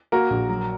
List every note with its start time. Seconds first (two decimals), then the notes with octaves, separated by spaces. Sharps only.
0.12 A#3 F#4 A#4
0.30 A#1
0.49 F#3